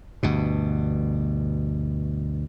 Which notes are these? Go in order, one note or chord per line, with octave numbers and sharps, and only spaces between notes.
D2 G2 B2